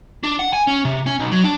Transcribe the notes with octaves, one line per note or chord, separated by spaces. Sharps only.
D4
F#5
G#5
C#4
C3
C#4
B1
F#3
D4